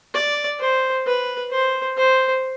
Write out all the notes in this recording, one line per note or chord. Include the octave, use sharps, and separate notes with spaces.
D5
C5
B4
C5
C5